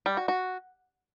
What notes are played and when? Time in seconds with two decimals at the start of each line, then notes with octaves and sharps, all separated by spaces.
0.06 G3
0.17 F#4
0.28 F#4